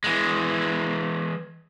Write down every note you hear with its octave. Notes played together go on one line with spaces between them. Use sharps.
E3 G#3